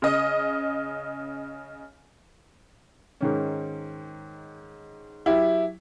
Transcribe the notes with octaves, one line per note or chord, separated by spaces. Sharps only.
C#3 D#5
G#2 D#3 C#4
F#3 E4 G4